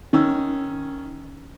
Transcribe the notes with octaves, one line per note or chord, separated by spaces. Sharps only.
D#3 C#4 E6